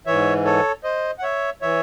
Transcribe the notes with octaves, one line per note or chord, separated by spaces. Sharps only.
G#2 E3 C#5 E5
A4 C#5
C5 D#5
F#5
C#5 E5
E3 C#5 E5